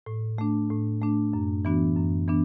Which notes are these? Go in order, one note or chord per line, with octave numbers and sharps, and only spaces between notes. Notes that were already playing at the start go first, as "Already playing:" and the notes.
A2
A3 D4
A2
A3 D4
F#2
E3 B3 D4 F#4
F#2
E3 B3 D4